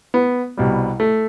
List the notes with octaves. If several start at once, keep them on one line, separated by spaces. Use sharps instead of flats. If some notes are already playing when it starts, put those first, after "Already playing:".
B3
C2 B2 G3
A3